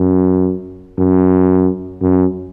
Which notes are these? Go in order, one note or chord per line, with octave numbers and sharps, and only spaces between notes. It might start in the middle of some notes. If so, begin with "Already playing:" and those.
Already playing: F#2
F#2
F#2